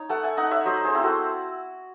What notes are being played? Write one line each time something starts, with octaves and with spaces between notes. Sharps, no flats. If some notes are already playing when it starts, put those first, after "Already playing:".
Already playing: D#4 C#5
A3 F#5 A5
E5 G#5
D#4 D#5 F#5
C#5 E5
F#3 C5 D#5
G#4 C5
C4 E4
F#4 A4